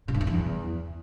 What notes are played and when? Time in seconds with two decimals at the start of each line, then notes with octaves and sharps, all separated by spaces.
0.08 C3
0.14 G2
0.21 F2
0.27 E2